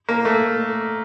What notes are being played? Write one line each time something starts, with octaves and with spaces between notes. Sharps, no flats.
A#3
A3